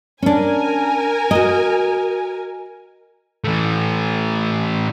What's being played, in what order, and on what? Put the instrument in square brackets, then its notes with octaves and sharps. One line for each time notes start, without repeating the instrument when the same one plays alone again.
[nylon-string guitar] C#4 D4 [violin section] A#4 G#5
[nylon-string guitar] F#4 D#5
[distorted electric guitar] E3 A3